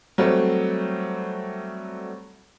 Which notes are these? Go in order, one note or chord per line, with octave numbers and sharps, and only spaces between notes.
F#3 G3 A3 C4